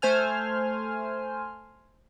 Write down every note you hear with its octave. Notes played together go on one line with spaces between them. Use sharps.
A3 C5 G#5 F6